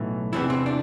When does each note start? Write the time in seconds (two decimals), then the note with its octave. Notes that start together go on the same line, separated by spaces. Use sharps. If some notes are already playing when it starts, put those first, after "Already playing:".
Already playing: B1 A2 E3
0.33 E2 C3 E3 E4
0.50 C4
0.66 D4